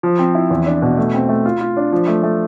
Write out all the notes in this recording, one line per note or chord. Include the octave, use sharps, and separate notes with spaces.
F3
C4
E4
E2
D4
B2
A3
C4
A3
F4
F4
D4
F3
A3
A3